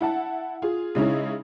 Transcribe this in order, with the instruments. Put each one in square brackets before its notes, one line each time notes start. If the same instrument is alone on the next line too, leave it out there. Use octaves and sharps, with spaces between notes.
[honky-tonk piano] E4 F#5 A5
F4 G#4
C#3 G#3 C#4 D#4 E4 G#4